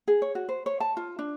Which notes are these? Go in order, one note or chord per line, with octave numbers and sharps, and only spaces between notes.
G#4
C#5
F#4
C5
C#5
A5
F4
D4